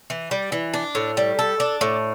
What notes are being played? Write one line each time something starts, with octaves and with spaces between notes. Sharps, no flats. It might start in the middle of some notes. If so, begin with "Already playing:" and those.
E3
G3
E3
D4
A2
G3
A4
D4
A2